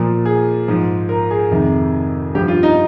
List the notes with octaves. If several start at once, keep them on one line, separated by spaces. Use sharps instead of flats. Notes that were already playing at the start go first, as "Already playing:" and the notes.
Already playing: A#2 F3
G#4
G#2 F3
A#4
G#4
F2 C3 D#3
G2 F3 G4
F4
D#4